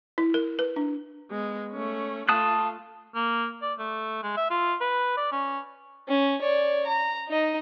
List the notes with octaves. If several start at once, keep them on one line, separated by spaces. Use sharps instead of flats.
E4
A#4
B4
D4
G#3 B3
A3 C#4
A3 F4 A5 D#6 F#6
A#3
D5
A3
G#3
E5
F4
B4
D5
C#4
C#4
C#5 D5
A#5
D#4 D#5